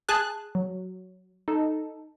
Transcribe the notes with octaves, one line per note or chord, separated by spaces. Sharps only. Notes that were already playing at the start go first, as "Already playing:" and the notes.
G#4 A5 F#6
F#3
D#4 A4